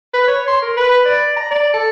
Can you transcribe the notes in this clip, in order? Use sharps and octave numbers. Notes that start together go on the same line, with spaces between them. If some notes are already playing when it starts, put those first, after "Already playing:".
B4
C#5
C6
A#4
B4
D5
A#5
D5
A4